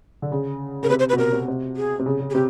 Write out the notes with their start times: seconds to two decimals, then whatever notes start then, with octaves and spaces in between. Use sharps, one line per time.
0.22 D3
0.32 C#3
0.83 C#3 A#4
0.89 C3 B4
0.99 C5
1.09 B4
1.13 B2
1.18 C3 A#4
1.33 C3
1.48 C3
1.77 G#4
1.99 C3
2.06 C#3
2.20 C#3
2.30 G#4
2.34 C3 G4